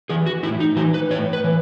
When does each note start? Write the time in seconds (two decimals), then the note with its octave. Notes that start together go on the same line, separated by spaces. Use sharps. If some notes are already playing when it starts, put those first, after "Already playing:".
0.09 E3 G#4
0.26 F#4
0.43 A2 E4
0.60 D#4
0.76 E3 F#4
0.94 B4
1.10 A2 C#5
1.33 B4
1.44 E3